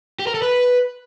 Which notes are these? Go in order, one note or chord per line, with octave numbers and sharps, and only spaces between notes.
G4
A#4
A4
B4